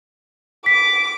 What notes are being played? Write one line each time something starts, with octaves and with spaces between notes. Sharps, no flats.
D6 B6